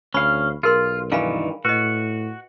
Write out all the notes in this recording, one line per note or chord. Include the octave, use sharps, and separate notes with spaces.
D2 C#4 F5 B5
B1 F4 G#4 A#4 C6
G2 D#3 E3 F5 G#5 B5
A2 F#4 B4 D#5